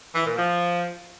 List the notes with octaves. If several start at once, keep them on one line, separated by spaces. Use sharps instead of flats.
E3
A#2
F3